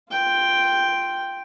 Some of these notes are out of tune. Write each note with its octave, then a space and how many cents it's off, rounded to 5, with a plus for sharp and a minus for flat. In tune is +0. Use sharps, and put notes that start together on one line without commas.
F4 +0 G5 +0